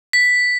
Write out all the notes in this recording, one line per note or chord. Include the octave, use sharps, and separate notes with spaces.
B6